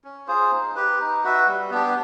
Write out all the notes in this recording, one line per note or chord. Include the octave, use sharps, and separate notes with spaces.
C#4
F4 G#4 C5
D#4
G4 B4
D#4
F#4 B4 E5
G3
B3 D4 G4